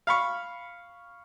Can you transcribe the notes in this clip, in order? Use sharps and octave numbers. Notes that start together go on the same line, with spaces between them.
F5 B5 C#6